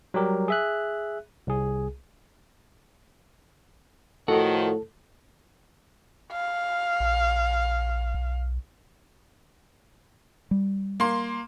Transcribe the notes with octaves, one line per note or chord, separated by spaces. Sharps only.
F#3 G3 G4 A#4
G#4 E5 F#6
C2 G#4
A2 D#3 F3 F#4 A4
F5
A#1
B1
G3
A#3 C6